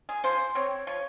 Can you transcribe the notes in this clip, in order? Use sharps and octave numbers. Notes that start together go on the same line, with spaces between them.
G#4
F3 C5
C4 C#5
F3 C#5